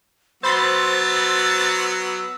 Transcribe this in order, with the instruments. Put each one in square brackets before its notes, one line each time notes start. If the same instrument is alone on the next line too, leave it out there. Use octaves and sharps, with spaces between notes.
[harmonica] F#3 B3 F#4 [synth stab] C5 B5 C6 [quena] E6 [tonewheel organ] A6